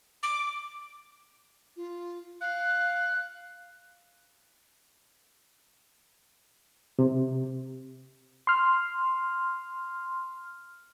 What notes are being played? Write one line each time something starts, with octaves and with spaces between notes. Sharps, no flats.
D6
F4
F5 F#6
C3
C6 F6